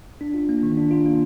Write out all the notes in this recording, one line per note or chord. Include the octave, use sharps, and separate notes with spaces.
D4
F4
A#3
D#3
D4
F4
A#3